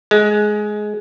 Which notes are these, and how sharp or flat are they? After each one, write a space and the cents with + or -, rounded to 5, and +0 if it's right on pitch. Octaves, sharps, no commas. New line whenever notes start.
G#3 +15